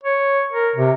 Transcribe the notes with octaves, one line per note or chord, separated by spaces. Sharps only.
C#5
A#4
C3